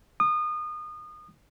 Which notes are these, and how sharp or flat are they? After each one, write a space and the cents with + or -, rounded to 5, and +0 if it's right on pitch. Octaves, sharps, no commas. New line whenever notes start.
D#6 -30